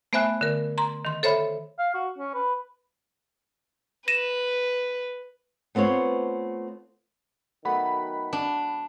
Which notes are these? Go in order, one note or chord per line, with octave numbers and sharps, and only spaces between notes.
A3 B3 C5 E5 G#5 F#6
D3 A#4
A#5 C6
D#3 C6
A4 C5 C#5 E5 B5
F5
F#4
C#4
B4
B4 A#6 D#7 E7
A3 B3 C4 F4 C#5
D#3 F#3 A3 B3 F#5 B5
D4